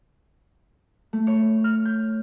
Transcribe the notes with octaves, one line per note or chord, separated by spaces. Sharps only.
A3
C#5
F6
G6